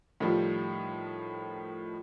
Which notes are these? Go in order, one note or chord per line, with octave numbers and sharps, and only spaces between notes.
A2 D#3 F3 G3